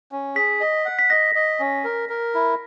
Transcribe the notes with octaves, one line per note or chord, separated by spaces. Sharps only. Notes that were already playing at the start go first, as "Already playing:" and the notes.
C#4
G#4 B6
D#5
F#5
B6
D#5 A#6
D#5
C#4
A#4
A#4
E4